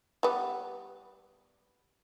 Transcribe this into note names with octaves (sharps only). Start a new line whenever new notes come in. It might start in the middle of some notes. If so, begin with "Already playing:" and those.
G3 B3